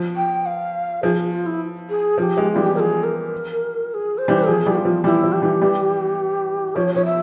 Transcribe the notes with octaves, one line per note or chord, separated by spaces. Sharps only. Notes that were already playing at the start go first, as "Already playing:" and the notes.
Already playing: F3
G5
F5
F3 G#4
F4
E4
G#4
F3 G4 G#4
F3 G#3
E3 G3 F4
G4
F3 G#4 A#4
A#4
A#4
G#4
C5
E3 G3
F3 G#4
E3 G3
F4
F3
E3 G3 E4
F3
G4
E3 G3
E3 G3
F3 C#5
F3 C#5
E5